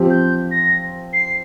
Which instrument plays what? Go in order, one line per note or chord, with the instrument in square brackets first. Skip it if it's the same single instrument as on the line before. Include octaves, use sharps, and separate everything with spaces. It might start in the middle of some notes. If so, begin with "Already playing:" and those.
Already playing: [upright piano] F3 C4 G4
[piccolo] G6
A#6
C7